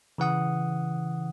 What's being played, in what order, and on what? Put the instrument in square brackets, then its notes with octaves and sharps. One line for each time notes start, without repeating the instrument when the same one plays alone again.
[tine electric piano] C#3 E3 F#5 D#6